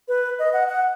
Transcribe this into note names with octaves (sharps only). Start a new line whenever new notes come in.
B4
D#5
F#5
F#5